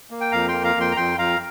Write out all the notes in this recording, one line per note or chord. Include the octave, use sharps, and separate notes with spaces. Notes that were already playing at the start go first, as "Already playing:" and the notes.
A#3
G5
F2 F5 A#5
A#3 G5 C6
F5 A#5
F2
G5 C6
A#5
F2 G5 C6
F2 F5 A#5